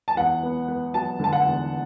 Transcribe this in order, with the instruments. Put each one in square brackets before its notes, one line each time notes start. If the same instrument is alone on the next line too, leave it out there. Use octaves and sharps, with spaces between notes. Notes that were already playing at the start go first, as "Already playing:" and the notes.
[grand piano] A5
E2 F#5
B3
B3
F#3 A5
D3 A5
F#5
E2